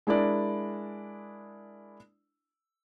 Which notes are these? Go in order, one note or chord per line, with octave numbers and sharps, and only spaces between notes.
G#3 D4 E4 A#4 D5